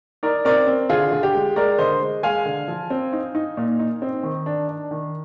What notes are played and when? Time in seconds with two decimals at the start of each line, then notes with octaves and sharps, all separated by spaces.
0.23 D#4 A#4 D5
0.45 C4 A#4 D5
0.67 C4
0.89 D3 F4 G#4
1.12 D3
1.23 G4
1.35 G#3
1.56 G#3 A#4 D5
1.78 D3 C5 D#5
2.01 G#3
2.23 G#3 F5 G#5
2.45 D3
2.68 F3
2.90 C4
3.13 D#4
3.35 D#4
3.57 A#2
3.79 D#4
4.02 C4
4.23 D#3
4.46 D4
4.68 D4
4.91 D#3